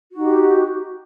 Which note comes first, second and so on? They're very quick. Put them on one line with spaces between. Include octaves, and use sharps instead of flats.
F#4 D#4 G4